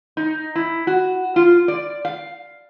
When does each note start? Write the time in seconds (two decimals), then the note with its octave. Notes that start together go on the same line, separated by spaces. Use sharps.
0.17 D#4
0.55 E4
0.87 F#4
1.36 F4
1.68 D5
2.05 F5